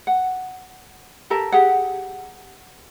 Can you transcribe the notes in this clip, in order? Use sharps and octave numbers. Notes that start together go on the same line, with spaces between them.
F#5
G4 A4 A#4 A5
G4 G#4 F#5